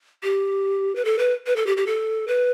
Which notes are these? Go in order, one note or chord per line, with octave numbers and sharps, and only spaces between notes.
G4
B4
A4
B4
B4
A4
G4
G4
A4
B4